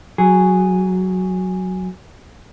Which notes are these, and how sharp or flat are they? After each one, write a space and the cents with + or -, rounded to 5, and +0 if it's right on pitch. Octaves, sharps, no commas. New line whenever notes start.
F#3 +0 G#4 -5